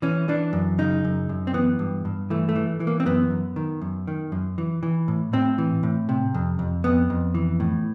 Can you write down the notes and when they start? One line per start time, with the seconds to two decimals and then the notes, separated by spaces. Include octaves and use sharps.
0.02 E3 C#4
0.29 E3 D4
0.53 F#2
0.78 C#3 D#4
1.04 F#2
1.29 F#2
1.47 C4
1.53 E3 B3
1.79 G2
2.05 G2
2.30 E3 A3
2.49 A3
2.55 E3
2.80 E3
2.87 A#3
3.00 C4
3.06 F#2 B3
3.31 F#2
3.56 D#3
3.81 F#2
4.07 D#3
4.32 F#2
4.58 E3
4.83 E3
5.08 A2
5.33 A2 C4
5.58 E3
5.83 A2
6.09 C3
6.34 F2
6.59 F2
6.84 F2 B3
7.10 F2
7.35 E3
7.60 A2